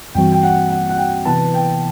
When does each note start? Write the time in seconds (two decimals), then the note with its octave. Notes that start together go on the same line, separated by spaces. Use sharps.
0.15 G2 E3 G3 C4 F#4 G5
0.32 G5
0.43 F#5
0.70 F#5
0.89 F#5
0.98 G5
1.25 C3 E3 B3 E4 B4 A5
1.54 G5